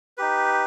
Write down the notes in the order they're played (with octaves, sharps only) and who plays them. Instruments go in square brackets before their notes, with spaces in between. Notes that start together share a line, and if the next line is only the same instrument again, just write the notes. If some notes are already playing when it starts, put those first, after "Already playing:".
[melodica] D#4 G4 B4